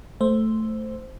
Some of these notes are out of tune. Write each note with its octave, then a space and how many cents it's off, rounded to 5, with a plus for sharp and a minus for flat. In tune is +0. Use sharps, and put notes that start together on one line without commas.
A3 +0 C5 +0